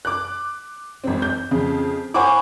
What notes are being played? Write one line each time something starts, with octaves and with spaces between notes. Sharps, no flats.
D6 F#6
G#1 C4
G6
F2 C#3
C5 F#5 G#5 B5 C#6 D6